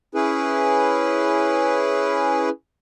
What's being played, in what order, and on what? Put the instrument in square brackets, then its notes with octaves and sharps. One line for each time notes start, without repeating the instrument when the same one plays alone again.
[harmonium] C#4 E4 G#4 B4